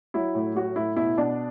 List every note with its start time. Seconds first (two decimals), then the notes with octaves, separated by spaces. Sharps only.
0.14 F#3 E4
0.35 A2
0.55 F#3 F#4
0.76 A2 E4
0.96 B2 E4
1.17 B2 D4